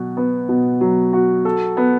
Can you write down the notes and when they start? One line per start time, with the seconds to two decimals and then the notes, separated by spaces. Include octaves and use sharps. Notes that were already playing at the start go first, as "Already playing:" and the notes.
Already playing: B2 F#3 F#4
0.17 B3
0.49 B2
0.81 F#3
1.13 F#4
1.45 A4
1.77 B3